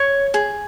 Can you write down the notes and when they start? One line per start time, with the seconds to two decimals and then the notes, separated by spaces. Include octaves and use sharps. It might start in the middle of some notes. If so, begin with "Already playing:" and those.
Already playing: C#5 C#6
0.34 G#4